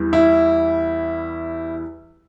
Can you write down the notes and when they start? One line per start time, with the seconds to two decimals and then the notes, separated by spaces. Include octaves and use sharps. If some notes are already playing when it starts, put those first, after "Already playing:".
Already playing: E2 E3 G3
0.13 E4